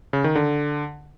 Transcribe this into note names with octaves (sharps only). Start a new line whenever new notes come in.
C#3
D#3
D3